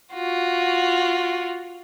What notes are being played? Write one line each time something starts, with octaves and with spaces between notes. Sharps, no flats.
F4 F#4